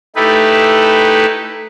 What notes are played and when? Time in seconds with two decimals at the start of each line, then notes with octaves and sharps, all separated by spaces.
0.16 A3 D#4 E4 G4 A4 B4